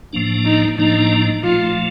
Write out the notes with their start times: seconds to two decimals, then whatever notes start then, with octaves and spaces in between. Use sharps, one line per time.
0.13 A2 F3 A#3 D4
0.45 D#4
0.78 A2 F3 A#3 D4 D#4
1.43 A#2 F3 A3 F4